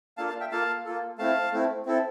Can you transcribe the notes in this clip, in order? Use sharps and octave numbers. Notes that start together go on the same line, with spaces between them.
A#3 D4 F4 A4 F5 A5
F5 A5
E5 G5
A#3 F4 A4 F5 A5
A#3 F4 A4
A3 C4 E4 F5 A5
A3 C4 E4
C4 E4 A4